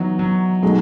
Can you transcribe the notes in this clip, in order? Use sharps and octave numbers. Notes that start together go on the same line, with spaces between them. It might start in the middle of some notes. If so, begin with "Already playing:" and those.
Already playing: E3 F#3 B3 D#4
F#3
B2 F#3 G#3 A3 D#4